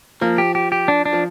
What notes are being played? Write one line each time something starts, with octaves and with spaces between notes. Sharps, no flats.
F3 A#3
G4
G4
G4
D4
D4
F3